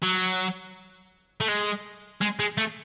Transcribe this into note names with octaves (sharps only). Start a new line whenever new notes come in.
F#3
A3
G#3
G#3
G#3
A3